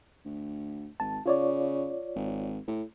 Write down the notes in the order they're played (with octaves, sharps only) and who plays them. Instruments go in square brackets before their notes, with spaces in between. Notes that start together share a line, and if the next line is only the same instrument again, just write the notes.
[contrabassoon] D2
[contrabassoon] G#1 [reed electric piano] A5
[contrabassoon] C#3 [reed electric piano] F4 C#5 D5
[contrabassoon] G#1
A2